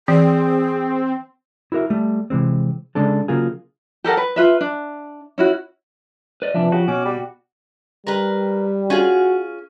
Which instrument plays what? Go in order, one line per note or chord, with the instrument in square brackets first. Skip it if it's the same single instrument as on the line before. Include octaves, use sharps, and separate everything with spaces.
[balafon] E3 [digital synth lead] C4 [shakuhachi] G#4
[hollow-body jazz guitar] E4 F#4 A#4 E5
G3 A3
C3 E3 G#3 C4
C#3 G#3 D4 A4
C#3 F#3 A#3 F4 G#4
[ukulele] G4 A4 A#4 F#5
B4
F4 B4 E5
D4
C#4 E4 F#4
[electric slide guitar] B4 D5 D#5
[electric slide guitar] C3 D4 E5 [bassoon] E3 [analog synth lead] F3
[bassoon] C#3 [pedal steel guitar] F#4 [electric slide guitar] G4
[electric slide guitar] B2 [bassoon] C#4 [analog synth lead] D6
[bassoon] G3
[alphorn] G3 [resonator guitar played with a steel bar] A#4 B4
[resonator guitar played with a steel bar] C#4 F4 G#4 [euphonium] F#4